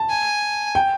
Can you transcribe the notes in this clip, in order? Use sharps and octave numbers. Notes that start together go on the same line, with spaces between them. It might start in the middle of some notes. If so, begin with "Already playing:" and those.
Already playing: A5
G#5
G5